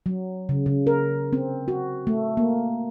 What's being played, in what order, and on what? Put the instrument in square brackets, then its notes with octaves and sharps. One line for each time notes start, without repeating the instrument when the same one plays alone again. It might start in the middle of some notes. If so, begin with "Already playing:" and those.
[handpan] F#3
C#3
C#3
A#4
C4
F#4
A3
A#3